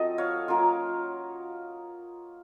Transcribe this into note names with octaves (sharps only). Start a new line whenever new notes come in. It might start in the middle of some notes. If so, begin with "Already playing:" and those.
Already playing: F#3 C4 F4 A4 D#5
C#5 F5
F#3 A#3 C#4 F4